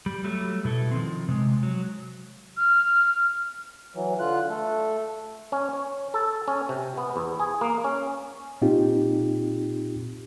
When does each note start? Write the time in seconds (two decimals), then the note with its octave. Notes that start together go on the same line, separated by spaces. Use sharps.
0.06 G3
0.24 F#3 G3 A3
0.65 B2 E4 A4
0.91 D#3 F3 C4
1.28 C3 G#3
1.63 F#3
2.57 F6
3.95 E3 F#3
4.20 D3 F4 F#6
4.49 A3 A4
5.52 C#4
5.73 C#5
6.14 A4
6.48 C#4
6.69 C3
6.97 B3
7.16 E2
7.40 G#4
7.61 A#3
7.84 C#4
8.62 A#2 C4 D#4 F4 G4